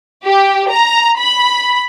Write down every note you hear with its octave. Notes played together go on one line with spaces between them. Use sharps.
G4
A#5
B5